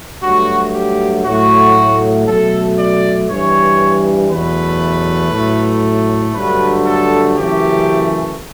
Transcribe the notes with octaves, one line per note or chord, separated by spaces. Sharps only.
G2 F#3 A3 F#4
G4
A2 F#3 A3 F#4
B2 F#3 A3 A4
D5
G2 E3 G3 C#5
E2 B2 F#3 A3 B4
A2 F#3 A3
G2 D3 F#3 A3 B4
A4
F#2 C#3 E3 A3 G4